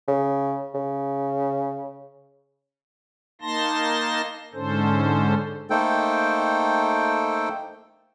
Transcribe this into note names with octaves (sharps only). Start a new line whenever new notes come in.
C#3
C#3
A#3 D#4 A5 C6 A#6
G#2 D3 C#4 A4 C5
A3 A#3 D#4 A4 C5 G5